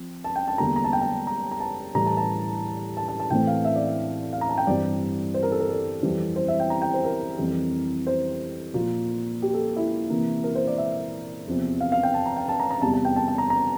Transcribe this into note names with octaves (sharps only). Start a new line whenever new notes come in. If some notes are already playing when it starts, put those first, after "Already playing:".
Already playing: F3 C4
A5
G5
A5
E2 D3 G3 A#3 A#5
A#5
A5
G5
A5
A#5
A#5
A5
A2 E3 G3 A#5
A5
A5
A5
A5
A5
A2 E3 A3 C4 G5
F5
E5
D5
E5
F5
A#5
A5
G5
G2 E3 G3 C4 D5
C5
A#4
A4
A#4
A4
F2 E3 G3 C4
C5
E5
G5
A#5
G5
C5
A#4
F2 E3 G3 C4
C5
A#2 F3 A#3 F4
G4
A4
E4
C3 E3 A#3
A#4
C5
D5
E5
E2 C3 F3 C4
F5
F5
G5
A5
A#5
G5
A5
A#5
A#5
E2 C3 G3 A5
A5
G5
A5
A5
A#5
A#5